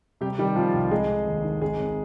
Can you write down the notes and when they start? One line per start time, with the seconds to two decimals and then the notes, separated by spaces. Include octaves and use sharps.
0.21 C3 G3 G4
0.38 D#3 G3 G4
0.56 C3 F3 F4
0.73 C2
0.91 F1 G#3 G#4
1.08 F1
1.27 D#2
1.44 D#3
1.61 G#1 G#3 G#4
1.80 G#1